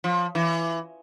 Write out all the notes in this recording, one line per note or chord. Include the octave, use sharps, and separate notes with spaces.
F3
E3